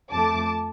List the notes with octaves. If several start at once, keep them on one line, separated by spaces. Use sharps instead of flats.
F2 F3 A3 A5 D6